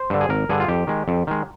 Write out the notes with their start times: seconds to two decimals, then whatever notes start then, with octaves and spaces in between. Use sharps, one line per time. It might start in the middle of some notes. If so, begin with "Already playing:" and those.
Already playing: C5
0.10 G2 D3
0.21 G#4
0.29 G#1 A#4
0.49 G2 D3 G#4
0.60 F4
0.68 F2 G4
0.87 D#3 G#3
1.08 F2
1.27 D#3 G#3